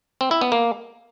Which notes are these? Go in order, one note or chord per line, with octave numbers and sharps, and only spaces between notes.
C4
E4
B3
A#3